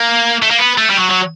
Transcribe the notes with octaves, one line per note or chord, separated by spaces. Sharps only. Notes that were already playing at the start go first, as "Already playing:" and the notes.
Already playing: A#3
A3
A#3
B3
A3
G3
F#3
F#3